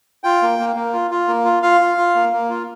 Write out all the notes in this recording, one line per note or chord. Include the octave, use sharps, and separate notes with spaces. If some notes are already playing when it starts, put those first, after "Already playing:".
F4 G5
A#3
A#3
A#3
F4
F4
A#3
F4
F4 F5
F4
F4
A#3
A#3
F4